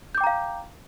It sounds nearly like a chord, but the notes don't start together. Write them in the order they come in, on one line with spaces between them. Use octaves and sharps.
G6 D6 G5 A#5 F5